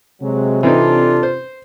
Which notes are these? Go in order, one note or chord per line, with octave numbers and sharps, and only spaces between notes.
C3 F#3 G#3
E3 C4 D4 D#4 F4 A4
C5